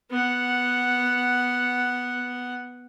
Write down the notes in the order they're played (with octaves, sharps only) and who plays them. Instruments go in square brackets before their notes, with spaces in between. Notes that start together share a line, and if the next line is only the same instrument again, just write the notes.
[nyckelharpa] B3 F#5